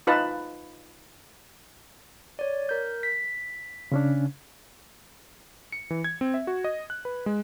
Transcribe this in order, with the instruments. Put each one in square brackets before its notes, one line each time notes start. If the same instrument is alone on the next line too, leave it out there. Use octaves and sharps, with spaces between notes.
[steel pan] D#4 F4 B4 D#5 A5
[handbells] C#5 D5
A#4 G6
B6
[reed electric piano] C#3 C#4 D4
[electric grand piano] C#7
E3
G#6
C4
E5
F#4
D#5
F#6
B4
G#3